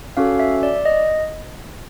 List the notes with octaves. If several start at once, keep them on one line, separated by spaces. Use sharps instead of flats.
C#4 F#4 A4 F5
E5
D5
D#5